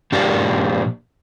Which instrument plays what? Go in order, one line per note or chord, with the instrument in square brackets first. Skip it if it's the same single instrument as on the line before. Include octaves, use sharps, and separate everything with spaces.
[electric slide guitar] A#2 F3 D4 G4